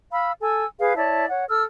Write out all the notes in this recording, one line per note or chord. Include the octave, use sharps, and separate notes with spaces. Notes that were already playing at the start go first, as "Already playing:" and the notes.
F5 B5 E6
A4 G#5 E6
G#4 B4 F5
E4 C#5 D5 A5
C#5 F#5
A4 E6 F6